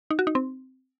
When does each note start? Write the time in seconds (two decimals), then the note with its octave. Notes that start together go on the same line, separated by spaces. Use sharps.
0.11 D#4
0.19 F#4
0.27 D#4
0.35 C4